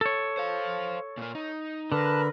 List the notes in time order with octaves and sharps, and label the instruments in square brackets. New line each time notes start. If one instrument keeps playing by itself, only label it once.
[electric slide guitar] A4 C#5
[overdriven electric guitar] C5 F5
A#2 A#3
D#4
[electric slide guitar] D3 [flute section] A#4 B4 [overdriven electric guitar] A5